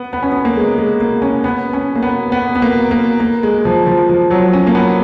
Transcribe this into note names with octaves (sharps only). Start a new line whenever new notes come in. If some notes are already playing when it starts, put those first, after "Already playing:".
Already playing: B3
B3
C#4
B3
A#3
G#3
G#3
A#3
C#4
B3
C#4
A#3
B3
B3
B3
A#3
A#3
A#3
G#3
F3
F3
F3
F#3
C#4
A#3
B3